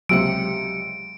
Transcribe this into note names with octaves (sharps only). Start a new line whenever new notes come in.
C#2 C3 F#3 G4 E6 C#7 D7